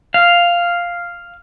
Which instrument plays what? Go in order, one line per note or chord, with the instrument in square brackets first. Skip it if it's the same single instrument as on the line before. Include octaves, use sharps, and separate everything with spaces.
[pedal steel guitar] F5